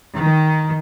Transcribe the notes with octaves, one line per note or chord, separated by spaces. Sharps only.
D#3